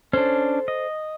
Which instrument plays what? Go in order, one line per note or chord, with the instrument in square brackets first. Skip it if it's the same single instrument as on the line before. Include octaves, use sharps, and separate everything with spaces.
[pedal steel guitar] C#4 D4 [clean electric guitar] A4 C5
[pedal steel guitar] D#5